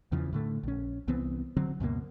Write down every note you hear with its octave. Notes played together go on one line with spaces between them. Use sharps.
E2 C#3 E3 F3
A2 D3 A3
A#1 C#4
C2 E3 B3 C4
D3 F#3 C4
C#2 F#2 B2 A#3